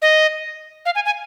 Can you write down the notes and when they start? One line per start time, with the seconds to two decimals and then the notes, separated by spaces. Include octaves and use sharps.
0.02 D#5
0.86 F5
0.95 G#5
1.05 G#5